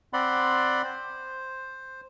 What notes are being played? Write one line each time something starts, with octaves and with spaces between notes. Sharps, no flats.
C4 D5 F#5 B5 C6
C5